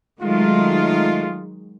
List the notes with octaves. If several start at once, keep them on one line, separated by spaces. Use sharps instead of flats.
D#3 F#3 G#3 A3 D#4 F4